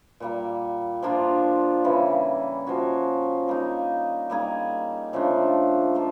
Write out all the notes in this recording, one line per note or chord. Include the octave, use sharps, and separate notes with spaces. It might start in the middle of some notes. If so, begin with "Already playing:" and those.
A#2 G3 A#3
F3 A#3 D4 F4
C#3 E3 G3
F3 A#3 C#4 F#4
G3 A#3 D#4
G3 A#3 D#4 G#4
C#3 F3 A3 D4
F3 A#3